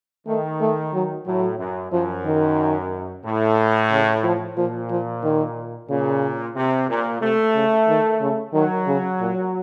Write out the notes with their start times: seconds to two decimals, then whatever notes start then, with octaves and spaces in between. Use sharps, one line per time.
0.27 D#3 A3
0.60 A3
0.93 F#3
1.26 A2 F#3
1.59 F#2
1.92 F#2 F3
2.25 D#3
3.25 A2
3.91 C#3
4.24 F3
4.57 A#2 F3
4.90 F3
5.23 D#3
5.89 A#2 C#3
6.55 C3
6.89 A#2
7.21 C3 A3
7.55 C#3
7.88 D#3
8.21 C#3
8.53 D#3 F#3
8.87 C#3
9.20 A#2